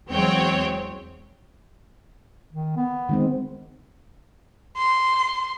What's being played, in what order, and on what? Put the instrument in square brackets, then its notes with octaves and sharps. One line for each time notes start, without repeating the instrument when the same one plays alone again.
[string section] E2 F#3 G#3 C4 C#5 G5
[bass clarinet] D#3
B3
[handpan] D#3 G#3 C4
[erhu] C6